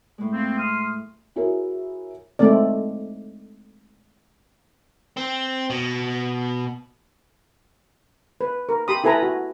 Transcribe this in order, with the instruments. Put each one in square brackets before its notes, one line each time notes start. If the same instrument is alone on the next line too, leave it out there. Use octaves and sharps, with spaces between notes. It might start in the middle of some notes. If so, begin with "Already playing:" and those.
[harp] A2 G#3
[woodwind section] A#3 C4
C6 D#6 F6
[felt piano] E4 F#4 G#4 A#4 C#5
[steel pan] G#3 A3 C4 D5
[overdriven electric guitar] C4
B2
[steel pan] B4
A#4
G4 B5 C6 D#6
E4 A4 B4 G#5 A#5 B5
F#4